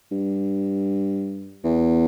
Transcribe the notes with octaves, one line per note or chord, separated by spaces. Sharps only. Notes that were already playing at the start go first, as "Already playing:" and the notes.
G2
E2